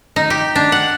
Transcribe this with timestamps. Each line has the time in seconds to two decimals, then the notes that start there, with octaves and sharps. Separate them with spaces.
0.16 D#4
0.30 G4
0.55 D4
0.72 F#5